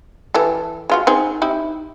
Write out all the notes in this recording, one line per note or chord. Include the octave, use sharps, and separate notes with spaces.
E3 G4 A4
G#3 F4 F#4
C4 D#4 G#4
D#4 E4 G4